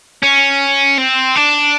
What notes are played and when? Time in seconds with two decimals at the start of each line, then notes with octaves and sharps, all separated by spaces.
0.23 C#4
0.98 C4
1.36 D4